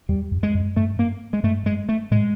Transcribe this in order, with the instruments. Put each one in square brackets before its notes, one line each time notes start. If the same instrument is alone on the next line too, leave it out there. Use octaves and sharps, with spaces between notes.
[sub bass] E2 [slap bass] G3
[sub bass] F2
[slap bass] G#3
[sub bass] F#2
[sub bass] G2 [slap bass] A3
[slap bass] A#3
G#3
[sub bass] G2 [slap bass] A3
[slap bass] G#3
A3
[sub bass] A2 [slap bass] G#3